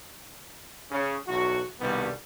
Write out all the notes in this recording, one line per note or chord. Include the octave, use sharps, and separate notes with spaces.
C#3
B1 E2 E4 F#4
C2 G2 B2 D#3 G3 B3